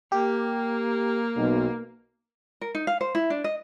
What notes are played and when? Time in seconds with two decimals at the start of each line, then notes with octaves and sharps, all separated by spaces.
0.12 A#3 G4
1.36 B1
2.61 A#4
2.75 D#4
2.87 F5
3.01 C5
3.15 E4
3.30 D4
3.44 D#5